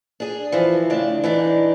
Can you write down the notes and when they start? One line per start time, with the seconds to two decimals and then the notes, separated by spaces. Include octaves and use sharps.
0.20 D4 G#4
0.52 E3 F3
0.90 A2 C#3 D4
1.24 E3 D4 D#4